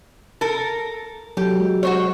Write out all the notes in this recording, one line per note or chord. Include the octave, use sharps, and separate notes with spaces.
A4 A#4
F#3 G4 A4
G#3
F#4 C5 C#5